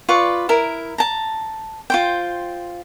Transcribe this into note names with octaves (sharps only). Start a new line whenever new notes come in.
F4 B4 D5 C#6
E4 A#4
A5 A#5
F4 C5 G5